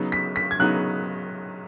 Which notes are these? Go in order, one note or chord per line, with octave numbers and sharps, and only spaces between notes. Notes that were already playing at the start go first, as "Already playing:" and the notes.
Already playing: C#3 F#3 B3 D#4
B6
B6
G#6
C#3 F#3 B3 D#4 F#6